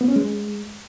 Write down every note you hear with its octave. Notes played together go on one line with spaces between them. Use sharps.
B3
C#4
G#3